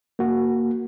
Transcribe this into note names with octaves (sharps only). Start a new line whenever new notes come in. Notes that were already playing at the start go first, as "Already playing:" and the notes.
A#3 F#4